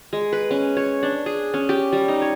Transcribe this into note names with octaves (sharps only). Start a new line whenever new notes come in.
G#3
B4
C#4
C#5
D4
G#4
C#4
G4
G3
D#4
C#5